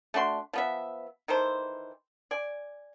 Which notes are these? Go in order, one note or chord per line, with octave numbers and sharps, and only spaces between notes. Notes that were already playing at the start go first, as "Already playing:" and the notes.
A3 D4 F#4 C6
F3 B3 E5
D#3 E3 A4 C5
D5 G#5